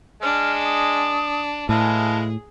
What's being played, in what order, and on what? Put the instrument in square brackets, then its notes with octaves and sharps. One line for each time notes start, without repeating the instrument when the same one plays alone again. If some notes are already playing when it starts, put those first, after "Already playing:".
[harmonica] G#3 [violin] D4 [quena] F6
[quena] D#6
[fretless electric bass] A2 [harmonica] E3 G#3 F5 [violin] G#4 [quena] A5